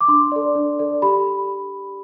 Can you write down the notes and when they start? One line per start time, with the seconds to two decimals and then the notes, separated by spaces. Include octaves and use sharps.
0.01 D6
0.08 D4 C6
0.32 A4 D5
0.55 D4
0.79 A4 D5
1.02 G4 B5